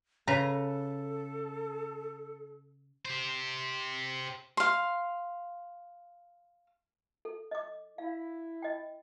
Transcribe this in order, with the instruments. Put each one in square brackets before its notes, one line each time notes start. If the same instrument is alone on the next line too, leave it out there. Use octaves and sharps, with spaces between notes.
[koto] C#3 B4 A#5 [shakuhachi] A4
[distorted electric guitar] G4 C5
[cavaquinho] F5 C6
[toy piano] A4
D#5 D6
[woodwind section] E4 [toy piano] F5
[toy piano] D#5 G5